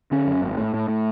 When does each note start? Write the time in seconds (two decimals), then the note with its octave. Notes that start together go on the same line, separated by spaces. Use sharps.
0.11 D3 C#4
0.27 F#2
0.42 G#1
0.57 A2
0.74 A2
0.89 A2